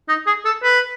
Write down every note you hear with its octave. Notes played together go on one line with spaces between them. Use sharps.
D#4
G#4
A4
B4